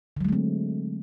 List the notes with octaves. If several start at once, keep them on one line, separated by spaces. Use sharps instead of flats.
D3 F#3 G#3 A3 C4